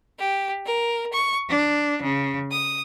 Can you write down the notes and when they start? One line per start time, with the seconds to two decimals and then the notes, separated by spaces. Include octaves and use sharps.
0.19 G4
0.66 A#4
1.11 C#6
1.49 D4
2.02 C#3
2.51 D#6